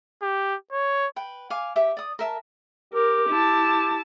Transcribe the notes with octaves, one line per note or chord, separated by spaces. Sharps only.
G4
C#5
B4 G5
F5 G#5 D6
G4 E5
D5 D#6
A#4 E5 A5
G4 A#4
E4 A5